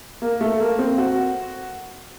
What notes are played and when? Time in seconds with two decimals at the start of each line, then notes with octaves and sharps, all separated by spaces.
0.22 A#3
0.41 A3
0.60 A#3
0.79 C4
0.98 F#4